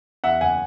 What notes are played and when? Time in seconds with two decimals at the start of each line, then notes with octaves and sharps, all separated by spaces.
0.24 E2 E5 F#5
0.41 F#1 F#5 G#5